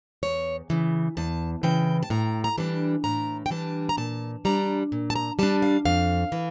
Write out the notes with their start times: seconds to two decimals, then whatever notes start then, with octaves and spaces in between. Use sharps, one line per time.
0.23 E2 C#5
0.70 C#3 E3
1.17 E2 A5
1.63 C#3 E3 G5
2.03 A5
2.10 A2 A#5
2.44 A#5
2.58 E3 G3 D4 A5
3.04 A2 A#5
3.46 G5
3.50 E3 G3 D4 A5
3.89 A#5
3.97 A#2 A5
4.45 G3 D4 A#5
4.92 A#2
5.10 A5
5.16 A#5
5.39 G3 D4 A5
5.62 F5
5.85 F2 F5
6.32 E3